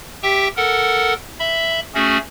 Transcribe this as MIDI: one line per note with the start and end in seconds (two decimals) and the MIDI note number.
0.23 0.48 67
0.23 0.48 76
0.23 0.48 79
0.57 1.14 69
0.57 1.14 70
0.57 1.14 78
1.39 1.80 76
1.39 1.80 83
1.95 2.18 57
1.95 2.18 61
1.95 2.18 66
1.95 2.18 68